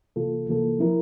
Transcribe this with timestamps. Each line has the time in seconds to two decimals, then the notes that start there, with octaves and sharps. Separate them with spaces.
0.16 C3 E3 A#3 F4 A4
0.48 C3 E3 A#3 F4 A4
0.79 F3 C4 E4 A#4